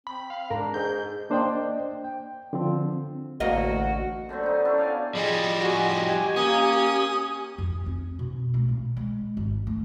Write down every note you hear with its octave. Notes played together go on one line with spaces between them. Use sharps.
C4 B5
F5
G#2 D4 A#4
G#2 G#4 G6
A#3 D4 C5 D5 D#5 G5
G5
D3 F3 C4
A1 D2 A#3 F#4 D#5
D3 D#3 F#3 C4
B3 D#4
C#4 D4 E4 A4
D5 F5 G5 G#5
F3 G3 G#4 D#5
F#4 G4 G#5
A#3 C#4 D#6
F2
C4
B2
A3
A#2
G#3
G#1
A3